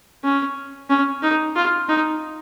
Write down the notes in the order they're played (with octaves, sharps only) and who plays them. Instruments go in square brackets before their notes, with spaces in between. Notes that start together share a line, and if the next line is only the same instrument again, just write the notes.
[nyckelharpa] C#4
C#4
D#4
F4
D#4